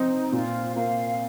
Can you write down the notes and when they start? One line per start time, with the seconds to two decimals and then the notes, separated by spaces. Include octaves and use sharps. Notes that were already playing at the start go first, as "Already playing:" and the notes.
Already playing: F3 C4 D#4
0.32 A#2 F4
0.76 A#3 F5